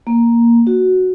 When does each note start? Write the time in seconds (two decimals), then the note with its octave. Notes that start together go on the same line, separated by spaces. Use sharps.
0.07 A#3
0.67 F#4